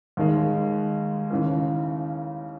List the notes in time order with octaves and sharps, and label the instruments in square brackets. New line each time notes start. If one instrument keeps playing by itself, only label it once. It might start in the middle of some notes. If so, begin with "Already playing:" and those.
[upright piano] D#2 D#3 G#3
D#2 C#3 E3